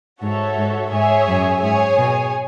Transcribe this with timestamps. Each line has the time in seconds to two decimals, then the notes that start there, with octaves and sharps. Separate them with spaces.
0.22 G#2 F#4 A4 C#5 E5
0.57 G#2
0.91 G#2 G#4 C#5 E5 G#5
1.27 F#2
1.62 G#2 G#4 C#5 G#5
1.98 B2